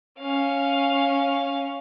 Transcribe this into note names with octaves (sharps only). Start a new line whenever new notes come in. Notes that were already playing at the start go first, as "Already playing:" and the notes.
C#4 F5